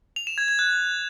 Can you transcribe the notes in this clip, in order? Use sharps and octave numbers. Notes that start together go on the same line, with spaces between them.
F7
E7
G#6
G#6
F#6